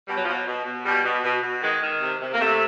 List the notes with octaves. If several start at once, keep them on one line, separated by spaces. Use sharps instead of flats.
B2 G3
F#3
B2 F3
F#3
B2
B2
B2 G3
B2
B2
B2
D#3 G#3
D#3
C3
C3
A#3
C3 A3